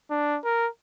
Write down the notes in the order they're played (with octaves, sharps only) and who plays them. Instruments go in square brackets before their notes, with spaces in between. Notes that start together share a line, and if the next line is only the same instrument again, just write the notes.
[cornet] D4
A#4